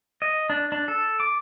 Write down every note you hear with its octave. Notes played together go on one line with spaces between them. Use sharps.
D#5
D4
D4
A4
D6